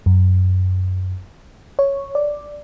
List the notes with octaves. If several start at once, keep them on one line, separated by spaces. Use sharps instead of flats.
F#2
C#5
D5